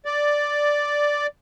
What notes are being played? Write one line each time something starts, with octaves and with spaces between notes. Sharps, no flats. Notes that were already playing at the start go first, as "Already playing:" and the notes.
D5